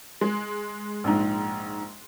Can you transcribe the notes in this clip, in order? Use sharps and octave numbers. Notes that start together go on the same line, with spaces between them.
G#3
A#1 G#2